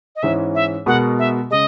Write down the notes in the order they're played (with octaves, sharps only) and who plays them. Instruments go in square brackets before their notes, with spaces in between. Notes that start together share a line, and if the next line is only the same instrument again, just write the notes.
[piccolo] D#5
[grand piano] G#2 E3 G#3 C#4 G#4 [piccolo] E5
[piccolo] E5
[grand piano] B2 G#3 B3 F#4 A#4 [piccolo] F#5
[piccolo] E5
[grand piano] C#3 G#3 [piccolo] D#5